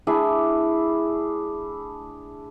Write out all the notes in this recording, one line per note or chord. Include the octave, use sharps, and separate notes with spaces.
A3 D4 E4 G#4